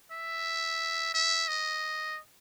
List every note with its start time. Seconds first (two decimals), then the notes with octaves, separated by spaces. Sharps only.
0.11 E5
1.14 E5
1.48 D#5